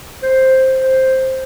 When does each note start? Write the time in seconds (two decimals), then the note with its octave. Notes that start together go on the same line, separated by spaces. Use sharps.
0.23 C5
0.80 C5